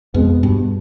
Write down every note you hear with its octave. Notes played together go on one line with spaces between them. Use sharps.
F2 B2 G#3 B3
G2 B2